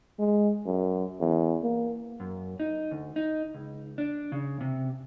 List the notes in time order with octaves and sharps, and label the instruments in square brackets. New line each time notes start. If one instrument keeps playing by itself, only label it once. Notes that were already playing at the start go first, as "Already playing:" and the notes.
[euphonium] G#3
F#2
E2
A#3
[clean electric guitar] F#2
D#4
D2
D#4
C#2
D4
C#3
C3